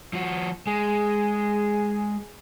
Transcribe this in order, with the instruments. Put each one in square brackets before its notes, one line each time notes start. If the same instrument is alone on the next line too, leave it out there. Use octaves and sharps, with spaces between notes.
[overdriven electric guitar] F3 F#4
[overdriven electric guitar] G#3 [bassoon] G#4